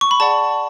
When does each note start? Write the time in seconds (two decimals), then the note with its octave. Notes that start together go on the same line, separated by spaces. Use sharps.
0.01 C#6
0.11 B5
0.20 G#4 D5 F#5 A5